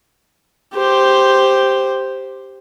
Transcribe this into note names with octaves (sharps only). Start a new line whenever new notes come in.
G4 C5